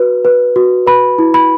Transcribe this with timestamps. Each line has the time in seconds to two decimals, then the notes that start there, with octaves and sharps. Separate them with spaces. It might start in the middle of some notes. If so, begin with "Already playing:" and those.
Already playing: F#4 B4
0.25 B4
0.56 F#4
0.87 B4 B5
1.19 E4
1.34 B5